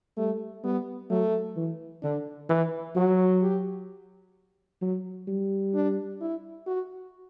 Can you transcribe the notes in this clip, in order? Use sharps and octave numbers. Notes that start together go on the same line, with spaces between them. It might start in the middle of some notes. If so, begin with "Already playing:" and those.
G3 A3
G3 B3
F#3 A3
E3
D3 D4
E3 E4
F#3 F#4
G4
F#3
G3
D4
E4
F#4